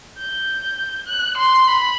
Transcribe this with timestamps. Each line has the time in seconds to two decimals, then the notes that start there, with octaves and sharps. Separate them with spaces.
0.18 G6
1.07 F#6
1.38 C6
1.68 B5